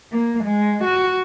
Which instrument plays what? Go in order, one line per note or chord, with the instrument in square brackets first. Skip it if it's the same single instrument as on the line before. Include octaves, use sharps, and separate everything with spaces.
[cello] A#3
G#3
F#4